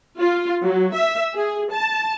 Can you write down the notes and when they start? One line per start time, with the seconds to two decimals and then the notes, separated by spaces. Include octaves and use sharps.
0.20 F4
0.61 F#3
0.94 E5
1.34 G#4
1.72 A5